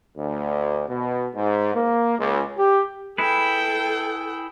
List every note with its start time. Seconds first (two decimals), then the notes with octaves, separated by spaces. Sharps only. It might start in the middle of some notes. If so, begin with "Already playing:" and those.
0.17 D2
0.89 B2
1.36 G#2
1.75 A#3
2.19 C#2
2.58 G4
3.18 E4 G#4 A4 B4 G5